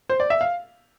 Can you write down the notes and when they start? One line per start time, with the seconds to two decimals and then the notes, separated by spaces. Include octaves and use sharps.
0.09 C5
0.20 D5
0.30 E5
0.41 F5